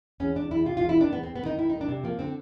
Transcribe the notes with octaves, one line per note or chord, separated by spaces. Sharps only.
E2 C#4
E2 D4
E2 E4
C3 F4
F4
E2
E4
D#3 D4
E2 B3
C4
E2
B3
D#3 D#4
D#3 E4
D#4
D#3
D4
C3
F3 A#3
D3 C4